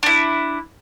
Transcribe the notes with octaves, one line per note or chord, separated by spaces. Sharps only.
D4 E4